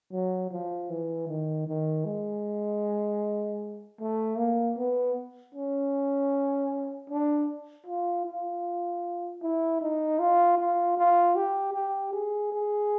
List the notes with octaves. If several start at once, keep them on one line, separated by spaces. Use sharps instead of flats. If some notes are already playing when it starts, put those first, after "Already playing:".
F#3
F3
E3
D#3
D#3
G#3
A3
A#3
B3
C#4
D4
F4
F4
E4
D#4
F4
F4
F4
G4
G4
G#4
G#4